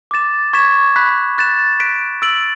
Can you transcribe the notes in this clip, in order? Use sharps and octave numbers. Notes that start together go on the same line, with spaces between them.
D6 A6 E7
C#6 G#6 B6 E7
B5 F#6 B6
F#6 A6 E7
F#6 B6 D7
E6 A6 D7 F#7